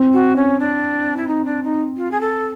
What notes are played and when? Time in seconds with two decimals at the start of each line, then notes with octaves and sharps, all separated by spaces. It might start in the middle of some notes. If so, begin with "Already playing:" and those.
Already playing: C4
0.13 F#4
0.36 C#4
0.59 D4
1.16 E4
1.27 D#4
1.45 D4
1.63 D#4
1.97 F4
2.11 G#4
2.20 A4